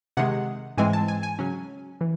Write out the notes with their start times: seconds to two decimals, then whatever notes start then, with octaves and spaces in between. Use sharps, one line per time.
0.17 C3 D#3 G#3 F#5
0.77 G#2 E3 G#3 C4 G#5
0.93 A5
1.08 G#5
1.23 G#5
1.39 C#3 F#3 C#4
2.01 E3